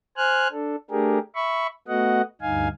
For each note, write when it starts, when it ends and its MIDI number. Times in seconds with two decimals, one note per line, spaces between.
0.17 0.48 72
0.17 0.48 80
0.17 0.48 89
0.17 0.48 90
0.52 0.76 62
0.52 0.76 69
0.90 1.19 57
0.90 1.19 62
0.90 1.19 67
0.90 1.19 68
0.90 1.19 70
1.35 1.67 76
1.35 1.67 83
1.35 1.67 85
1.88 2.21 57
1.88 2.21 59
1.88 2.21 66
1.88 2.21 75
1.88 2.21 78
2.42 2.68 38
2.42 2.68 43
2.42 2.68 63
2.42 2.68 77
2.42 2.68 80